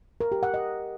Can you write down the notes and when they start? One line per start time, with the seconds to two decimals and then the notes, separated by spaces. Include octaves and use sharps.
0.21 A#4
0.32 G4
0.43 F#5
0.54 D#5